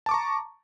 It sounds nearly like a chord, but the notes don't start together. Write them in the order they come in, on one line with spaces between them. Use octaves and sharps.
A5 D6 C#6 A#5